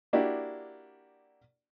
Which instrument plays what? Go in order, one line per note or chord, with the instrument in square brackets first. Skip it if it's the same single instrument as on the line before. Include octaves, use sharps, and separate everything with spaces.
[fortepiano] A#3 D4 E4 F#4 G4